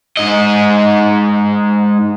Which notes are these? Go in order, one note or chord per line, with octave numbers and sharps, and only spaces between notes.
G#2 D#5